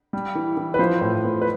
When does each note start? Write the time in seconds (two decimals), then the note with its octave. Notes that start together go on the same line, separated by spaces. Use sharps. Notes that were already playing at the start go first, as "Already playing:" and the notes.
0.13 G3
0.35 E3
0.57 E3
0.74 B4
0.79 F3 C5
1.01 A2
1.24 B3
1.41 B4